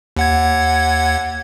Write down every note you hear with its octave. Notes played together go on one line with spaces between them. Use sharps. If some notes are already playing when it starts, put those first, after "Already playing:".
D#2 F#5 G#6